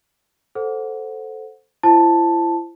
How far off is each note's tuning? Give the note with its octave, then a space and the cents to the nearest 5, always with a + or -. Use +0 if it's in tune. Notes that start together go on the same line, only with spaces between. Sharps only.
A4 +0 C5 +0 F#5 -15
E4 +40 C5 +5 A5 +0